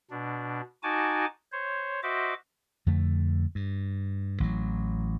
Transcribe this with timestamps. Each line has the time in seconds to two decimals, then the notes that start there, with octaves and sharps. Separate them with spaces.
0.10 B2 D4
0.83 D#4 F#4 G#5 A5 D6
1.52 C5 C#5
2.03 F#4 C5 D#5 E5 D6
2.86 F2 D3 A3
3.55 G2
4.40 A1 E3 F#3